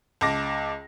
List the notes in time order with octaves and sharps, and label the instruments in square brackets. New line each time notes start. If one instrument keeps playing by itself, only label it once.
[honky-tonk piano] C#2 A5 D6 A#6